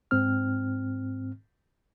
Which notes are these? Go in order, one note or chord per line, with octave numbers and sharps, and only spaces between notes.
G#2 C4 F6